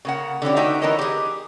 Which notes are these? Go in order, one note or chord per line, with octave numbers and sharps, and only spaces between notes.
C#3 A#3 F#5
D3 E3 C#4 G4
A3 B3 D#4 F#4 E5 G5
D3 E3 B3 A#4 C#5 D#5
G4 G#4